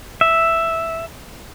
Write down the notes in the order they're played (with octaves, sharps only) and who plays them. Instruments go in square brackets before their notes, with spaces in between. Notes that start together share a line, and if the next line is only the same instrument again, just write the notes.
[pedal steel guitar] E5